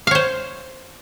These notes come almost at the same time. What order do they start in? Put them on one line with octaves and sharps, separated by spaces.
F5 C#5 C5